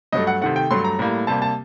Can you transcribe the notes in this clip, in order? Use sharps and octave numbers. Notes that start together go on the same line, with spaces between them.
G2 F#3 A3 D#5
F#5
C3 D#3 A3 F#5
G5
G2 F#3 A3 C6
A#5
A2 G3 A#3
C3 G3 A#3 A5
A5